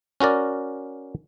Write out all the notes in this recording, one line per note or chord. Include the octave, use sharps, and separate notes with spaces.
C#4 F#4 A#4 D5